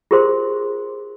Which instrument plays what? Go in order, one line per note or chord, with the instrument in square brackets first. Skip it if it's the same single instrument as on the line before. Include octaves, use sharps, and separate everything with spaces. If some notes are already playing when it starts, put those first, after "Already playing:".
[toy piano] F4 G4 G#4 A#4 C5 C6